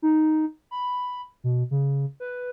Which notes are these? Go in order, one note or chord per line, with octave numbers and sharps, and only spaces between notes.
D#4
B5
B2
C#3
B4